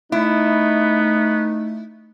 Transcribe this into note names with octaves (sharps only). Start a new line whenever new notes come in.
A3 B3 D#4 E4